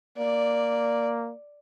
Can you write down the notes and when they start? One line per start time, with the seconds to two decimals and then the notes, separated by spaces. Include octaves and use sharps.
0.18 A#3 D5